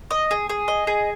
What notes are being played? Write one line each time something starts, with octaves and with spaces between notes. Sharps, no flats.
D#5
G#4
G#4
D#5
G#4